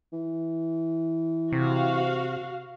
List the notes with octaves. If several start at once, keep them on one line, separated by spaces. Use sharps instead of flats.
E3
C3 F#4 F5